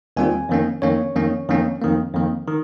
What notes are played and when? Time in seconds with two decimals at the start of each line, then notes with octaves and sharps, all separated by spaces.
0.17 D#2 D#3 G3 C4 F4 G#5
0.49 F2 D#3 A#3 C#4
0.82 F2 D#3 A#3 C#4 C#5
1.15 F2 D#3 A#3 C#4
1.49 F2 D#3 A#3 C#4
1.82 F2 D#3 A#3
2.14 F2 D#3 A#3
2.48 D#3